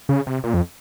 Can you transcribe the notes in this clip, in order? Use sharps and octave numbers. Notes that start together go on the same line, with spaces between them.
C#3
C3
A#2
F2